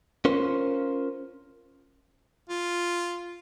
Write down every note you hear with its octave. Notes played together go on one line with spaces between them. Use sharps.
C#4 F4 A#4 C5
F4